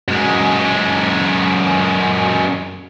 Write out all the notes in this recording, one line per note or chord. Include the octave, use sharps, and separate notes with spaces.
F#2 G#3